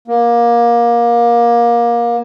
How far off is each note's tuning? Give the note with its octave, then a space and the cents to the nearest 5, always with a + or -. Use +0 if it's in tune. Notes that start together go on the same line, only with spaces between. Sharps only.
A#3 +20